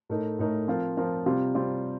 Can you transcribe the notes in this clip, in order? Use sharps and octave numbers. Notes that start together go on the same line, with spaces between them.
A2 A3 D#4 A#4
A2 A3 D#4 A#4
F3 C4 F4 A#4
F3 C4 F4 A#4
C3 G3 C4 F4
C3 G3 C4 F4